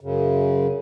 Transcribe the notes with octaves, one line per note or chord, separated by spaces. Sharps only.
F#2 C#3